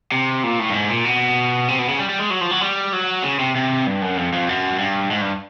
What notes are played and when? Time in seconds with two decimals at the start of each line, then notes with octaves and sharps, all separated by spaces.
0.12 C3
0.44 A#2
0.59 A2
0.70 G2
0.74 G#2
0.90 A#2
1.05 B2
1.68 C3
1.79 B2
1.89 C#3
1.99 G3
2.09 G3
2.19 G#3
2.30 F#3
2.41 F3
2.51 F#3
2.61 G3
2.93 F#3
3.24 C#3
3.39 C3
3.56 C3
3.87 G2
4.02 F#2
4.17 F2
4.33 F2
4.49 F#2
4.79 G2
5.11 G#2
5.21 G2